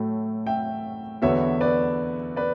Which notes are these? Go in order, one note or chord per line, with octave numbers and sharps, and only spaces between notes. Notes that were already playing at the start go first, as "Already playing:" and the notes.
Already playing: A2 F#3 A3
E5 G5
E2 D3 F#3 B3 C#5 E5
B4 D5
B4 D5